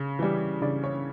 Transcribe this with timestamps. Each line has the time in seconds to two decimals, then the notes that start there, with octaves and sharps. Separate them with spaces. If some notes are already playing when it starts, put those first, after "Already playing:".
Already playing: C#3
0.19 E3 G3
0.62 C#3 D5
0.84 C#5